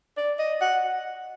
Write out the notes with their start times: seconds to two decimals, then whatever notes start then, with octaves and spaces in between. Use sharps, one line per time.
0.18 D5
0.39 D#5
0.61 F#5